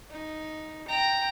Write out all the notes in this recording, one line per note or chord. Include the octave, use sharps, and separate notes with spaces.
D#4
G5 A#5